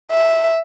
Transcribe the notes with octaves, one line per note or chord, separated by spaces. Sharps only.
E5